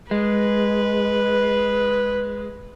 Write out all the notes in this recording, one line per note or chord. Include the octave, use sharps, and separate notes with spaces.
G#3 B4